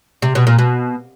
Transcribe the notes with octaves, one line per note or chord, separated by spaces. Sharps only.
C3
B2
A#2
B2